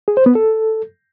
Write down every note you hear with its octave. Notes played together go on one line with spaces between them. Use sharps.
G#4
C5
B3
A4